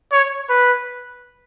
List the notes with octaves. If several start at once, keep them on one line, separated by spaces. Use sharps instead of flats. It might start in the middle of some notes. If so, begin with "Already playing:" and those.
C#5
B4